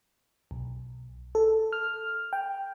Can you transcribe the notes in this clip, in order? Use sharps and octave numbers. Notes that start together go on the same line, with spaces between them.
B1
A4
F6
G5